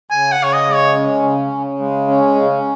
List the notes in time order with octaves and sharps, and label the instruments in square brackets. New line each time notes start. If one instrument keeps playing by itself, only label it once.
[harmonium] C#3 [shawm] G#5
[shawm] F#5
[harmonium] C#3 [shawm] C#5
[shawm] D#5
[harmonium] G#3
[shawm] C#5
[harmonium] C#4
C#3
C#3
G#3
C#4
C#3